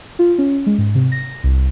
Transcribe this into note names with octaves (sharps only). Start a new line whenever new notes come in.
F4
C#4
G#3
G#2
C3
A#6
C2